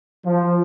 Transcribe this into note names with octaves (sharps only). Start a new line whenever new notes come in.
F3